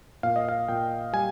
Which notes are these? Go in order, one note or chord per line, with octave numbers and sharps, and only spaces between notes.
A#2 F5
D#5
F5
A#2 G5
G3 G#5